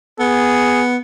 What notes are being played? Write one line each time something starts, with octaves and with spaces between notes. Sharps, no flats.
B3 G#4